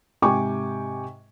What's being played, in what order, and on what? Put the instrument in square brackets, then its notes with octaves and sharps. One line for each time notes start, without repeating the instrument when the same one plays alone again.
[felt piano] G#2 C3 G5 G#5 C#6 D6